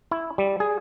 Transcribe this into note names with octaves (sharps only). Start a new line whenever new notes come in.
E4
G3
G#4